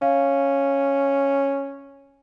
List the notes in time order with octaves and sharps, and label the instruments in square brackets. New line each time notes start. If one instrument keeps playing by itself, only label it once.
[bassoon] C#4 [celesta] F5